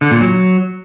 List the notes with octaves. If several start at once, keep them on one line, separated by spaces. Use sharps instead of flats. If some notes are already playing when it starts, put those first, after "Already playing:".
D3
A#2
F#3